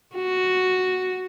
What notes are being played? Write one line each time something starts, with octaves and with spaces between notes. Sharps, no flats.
F#4